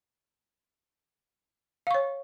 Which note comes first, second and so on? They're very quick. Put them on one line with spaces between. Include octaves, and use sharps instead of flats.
F5 C#6 C#5